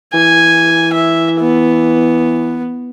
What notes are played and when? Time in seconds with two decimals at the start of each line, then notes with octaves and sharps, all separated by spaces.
0.14 E3 G#5
0.93 E5
1.41 B3